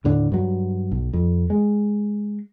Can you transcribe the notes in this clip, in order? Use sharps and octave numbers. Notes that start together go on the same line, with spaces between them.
D#2 A2 D3
G2 F#3
B1
F2
G#3